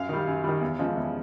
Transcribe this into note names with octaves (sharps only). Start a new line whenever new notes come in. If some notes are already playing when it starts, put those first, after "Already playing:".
Already playing: F#2 F5
D#3 G3
F#2
D#3 G3
E2
C#3 F3 G#3
E2